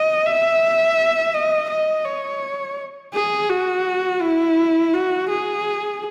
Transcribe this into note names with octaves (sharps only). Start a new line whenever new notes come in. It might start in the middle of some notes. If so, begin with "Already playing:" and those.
Already playing: D#5
E5
D#5
D#5
C#5
G#4
F#4
E4
F#4
G#4